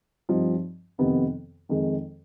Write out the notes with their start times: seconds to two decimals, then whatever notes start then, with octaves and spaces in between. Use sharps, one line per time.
0.29 G2 F3 C4 D#4
0.98 F2 C3 D#3 B3
1.69 F2 D#3 G#3